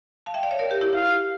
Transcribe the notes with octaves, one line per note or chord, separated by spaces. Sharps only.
F5 A5
E5 G5
D5 F5
C#5 E5
A#4 D5
G4 A#4
E4 G4
E4 G4 F5